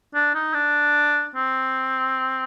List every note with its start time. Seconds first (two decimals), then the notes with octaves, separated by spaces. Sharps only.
0.14 D4
0.35 D#4
0.54 D4
1.36 C4